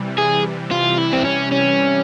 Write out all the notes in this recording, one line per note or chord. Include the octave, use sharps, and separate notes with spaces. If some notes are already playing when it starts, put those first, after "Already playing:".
Already playing: C3 E3 G3
G#4
F4
E4
C4
C#4
C#4